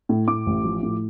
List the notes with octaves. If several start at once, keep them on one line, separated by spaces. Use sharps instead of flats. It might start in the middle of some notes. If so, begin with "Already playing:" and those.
A2
A2 D6
A1
F3
A2